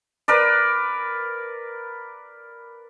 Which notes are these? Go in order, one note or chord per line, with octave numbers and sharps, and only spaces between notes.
A#4 B4 D5